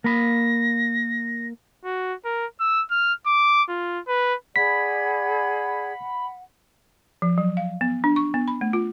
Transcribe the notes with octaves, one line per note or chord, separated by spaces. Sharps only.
A#3 B5 A#6
F#4
A#4
E6
F6
D6
F4
B4
G#4 D5 F#5 B5 G#6 B6
F3
F#3
F5
B3
D4
C#6
B3
B5
A3
F4